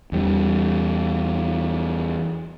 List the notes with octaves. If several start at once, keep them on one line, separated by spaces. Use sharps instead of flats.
E2 G3